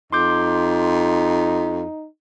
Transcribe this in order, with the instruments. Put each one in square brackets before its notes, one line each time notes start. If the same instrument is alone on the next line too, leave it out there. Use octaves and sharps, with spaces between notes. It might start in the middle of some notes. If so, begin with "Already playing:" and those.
[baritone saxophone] F2 [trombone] D#4 [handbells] C6 D6 G6